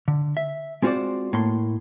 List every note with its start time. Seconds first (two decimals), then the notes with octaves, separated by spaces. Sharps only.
0.08 D3
0.37 E5
0.82 G#3 C4 F4 F#4 C5 D5
1.33 A2 A#3 C6